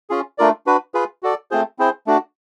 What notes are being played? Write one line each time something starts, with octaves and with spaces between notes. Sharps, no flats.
C#4 F4 G#4
A3 D4 F4 A#4 D5
D4 F#4 B4
F4 G#4 B4
F#4 A4 D5
A3 C4 F4 G#4 C5
C4 E4 G#4 C5
A3 D4 F#4